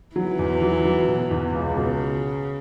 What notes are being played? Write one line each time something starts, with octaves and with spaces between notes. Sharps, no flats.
E3 F#3
E2
F#3
F#3
B2
E2
C#2 C#3
B2